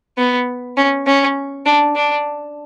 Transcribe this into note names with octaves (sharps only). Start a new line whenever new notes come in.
B3
C#4
C#4
D4
D4